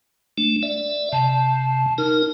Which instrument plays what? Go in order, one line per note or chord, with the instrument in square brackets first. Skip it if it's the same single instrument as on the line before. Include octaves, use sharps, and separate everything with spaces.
[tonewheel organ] A3 D4
D5 E5
[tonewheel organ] C3 [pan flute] A5
[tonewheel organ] D#4 A#4 [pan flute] F6